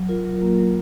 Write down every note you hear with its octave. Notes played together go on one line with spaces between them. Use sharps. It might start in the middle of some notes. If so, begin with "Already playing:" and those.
Already playing: F#3
F4 A#4
F#3
A#3
F#3